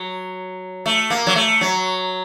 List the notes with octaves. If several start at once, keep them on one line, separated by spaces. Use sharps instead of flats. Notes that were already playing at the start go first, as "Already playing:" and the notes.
Already playing: F#3
A3
A#3
F#3
A3
F#3